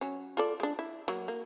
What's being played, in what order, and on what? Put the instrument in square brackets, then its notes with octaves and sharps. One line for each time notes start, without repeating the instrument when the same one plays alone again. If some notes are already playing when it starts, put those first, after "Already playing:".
[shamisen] F#3 C#4
F4 A4 D5
G#3 D4
E4
F#3 A#3
A#3